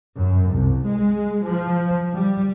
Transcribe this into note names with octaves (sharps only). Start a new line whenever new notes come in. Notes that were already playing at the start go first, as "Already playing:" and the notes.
F#2
C2
G#3
F3
G3